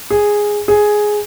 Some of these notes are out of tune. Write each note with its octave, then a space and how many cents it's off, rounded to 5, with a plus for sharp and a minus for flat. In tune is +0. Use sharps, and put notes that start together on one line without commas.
G#4 -5
G#4 +5